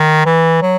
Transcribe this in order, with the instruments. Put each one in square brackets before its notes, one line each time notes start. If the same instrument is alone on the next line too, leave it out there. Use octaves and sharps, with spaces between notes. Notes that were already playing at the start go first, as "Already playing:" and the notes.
Already playing: [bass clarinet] D#3
E3
F#3